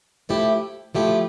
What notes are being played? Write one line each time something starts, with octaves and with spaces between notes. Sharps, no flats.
F3 A3 E4 G4
F3 A3 E4 G4